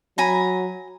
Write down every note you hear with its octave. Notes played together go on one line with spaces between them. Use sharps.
F#3 G#5 A#5 B5